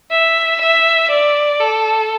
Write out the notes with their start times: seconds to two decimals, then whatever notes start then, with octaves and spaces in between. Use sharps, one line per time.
0.11 E5
0.61 E5
1.11 D5
1.60 A4